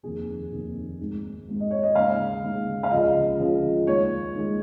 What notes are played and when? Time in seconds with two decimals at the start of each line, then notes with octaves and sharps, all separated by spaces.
0.03 F1 D#2 D#3 G#4
0.52 F1 D#2 D#3
1.00 G#1 G#2 G#3
1.48 G#1 G#2 G#3
1.60 D#5
1.71 C#5
1.83 D#5
1.95 D#2 C#3 G#3 F5
2.43 D#2 C#3 G#3
2.83 F5
2.91 C#2 C#3 F3 D#5
3.39 C#2 C#3 F3
3.87 D#2 D#3 G#3 C#5
4.34 D#2 D#3 G#3